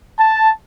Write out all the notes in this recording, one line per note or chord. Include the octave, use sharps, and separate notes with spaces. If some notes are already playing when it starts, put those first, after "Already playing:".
A5